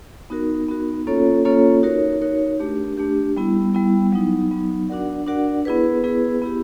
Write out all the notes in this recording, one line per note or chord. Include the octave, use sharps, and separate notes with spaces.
B3 D#4 F#4 A#4
B3 D#4 F#4 A#4
A#3 C#4 F4 A4 C#5
A#3 C#4 F4 A4 C#5
D#4 F#4 A#4 C#5
D#4 F#4 A#4 C#5
A3 D4 G4
A3 D4 G4
G3 B3 E4
G3 B3 E4
F#3 B3 D#4
F#3 B3 D#4
D4 F#4 A#4 D5 F#5
D4 F#4 A#4 D5 F#5
B3 E4 G#4 B4
B3 E4 G#4 B4
B3 E4 G4